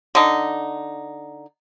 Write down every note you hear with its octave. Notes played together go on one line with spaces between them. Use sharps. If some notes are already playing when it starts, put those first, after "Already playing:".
D3 D#4